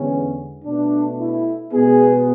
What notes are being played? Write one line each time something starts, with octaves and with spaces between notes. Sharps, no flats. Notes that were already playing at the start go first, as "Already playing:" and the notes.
Already playing: E2 D3 G#3 B3 C#4
B2 A3 D4
E4
B2 G#3 B3 G#4